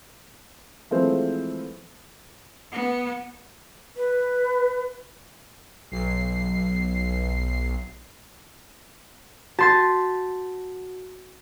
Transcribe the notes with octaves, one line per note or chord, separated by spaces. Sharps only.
E3 F3 G#3 A3 C4 C5
B3
B4
B1 C7
F#4 A5 C6 A6